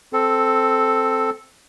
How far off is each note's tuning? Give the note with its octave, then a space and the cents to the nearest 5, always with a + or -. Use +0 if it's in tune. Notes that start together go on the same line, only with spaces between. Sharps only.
C4 +0 A4 +0